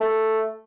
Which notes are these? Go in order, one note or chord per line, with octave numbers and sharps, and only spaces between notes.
A3